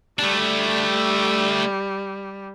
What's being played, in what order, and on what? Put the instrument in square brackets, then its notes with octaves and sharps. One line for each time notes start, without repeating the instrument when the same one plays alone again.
[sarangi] G3 [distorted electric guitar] A3 D4